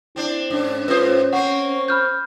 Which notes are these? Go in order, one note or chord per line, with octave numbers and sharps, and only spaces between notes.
C4 D4 E4
G#2 C#4 D4
G#2 C#4 F4 B4 C5 D#6
A#3 C4 F#5 C#6
B5 F6 G6